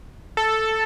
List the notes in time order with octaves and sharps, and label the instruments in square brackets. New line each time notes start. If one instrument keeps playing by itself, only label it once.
[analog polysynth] A4